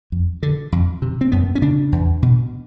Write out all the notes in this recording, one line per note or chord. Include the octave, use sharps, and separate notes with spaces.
F2
D3
F2
C3
C4
F#2 B3
C#4
C#3 D4
E2
B2